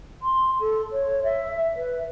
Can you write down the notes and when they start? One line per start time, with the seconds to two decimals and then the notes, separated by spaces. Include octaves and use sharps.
0.22 C6
0.60 A4
0.92 C#5
1.24 E5
1.77 B4